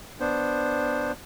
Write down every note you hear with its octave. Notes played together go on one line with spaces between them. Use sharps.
B3 D4 C5